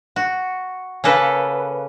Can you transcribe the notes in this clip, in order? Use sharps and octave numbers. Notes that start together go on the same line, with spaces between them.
F#4
C#3 A#3 A4 B4